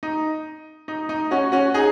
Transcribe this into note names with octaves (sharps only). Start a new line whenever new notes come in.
D#4
D#4
D#4
C#4 F#4
C#4 F#4
D#4 G#4